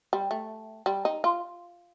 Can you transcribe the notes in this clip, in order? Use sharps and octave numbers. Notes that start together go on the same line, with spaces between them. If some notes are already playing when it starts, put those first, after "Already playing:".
G3
A3
G3
D#4
F4